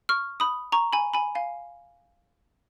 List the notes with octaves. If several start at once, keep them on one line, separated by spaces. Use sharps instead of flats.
C#6 F6
B5 D#6
A#5 C#6
G#5 B5
G#5 B5
F5 G#5